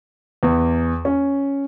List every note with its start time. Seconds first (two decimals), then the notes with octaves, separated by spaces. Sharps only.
0.43 E2
1.05 C#4